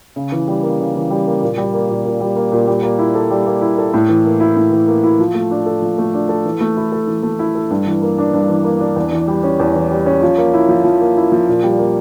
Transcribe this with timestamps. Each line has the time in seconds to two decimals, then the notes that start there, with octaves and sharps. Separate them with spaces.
0.16 C#3
0.32 E3
0.48 G3
0.63 A#3
0.80 C#3
0.95 E3
1.10 G3
1.27 A#3
1.42 A#2
1.57 G3
1.74 A#3
1.89 A#2
2.05 A#2
2.20 G3
2.36 A#3
2.52 A#2
2.67 G3
2.83 A#3
2.99 E4
3.15 A4
3.31 G3
3.46 A#3
3.61 E4
3.78 A4
3.94 A2
4.09 E3
4.25 A#3
4.40 E4
4.57 A2
4.72 E3
4.88 A#3
5.04 E4
5.19 F3
5.35 A3
5.51 D4
5.66 A4
5.82 F3
5.98 A3
6.14 D4
6.29 A4
6.45 E3
6.61 A3
6.77 E4
6.92 A4
7.07 E3
7.23 A3
7.39 E4
7.55 A4
7.70 G2
7.87 E3
8.02 A#3
8.18 D4
8.33 G2
8.49 E3
8.64 A#3
8.80 D4
8.96 E2
9.12 E3
9.28 G3
9.43 C#4
9.60 E2
9.75 E3
9.91 G3
10.06 C#4
10.22 F3
10.38 A#3
10.54 E4
10.69 F3
10.84 F3
11.01 A#3
11.17 E4
11.32 F3
11.48 A#2
11.63 G3
11.79 A#3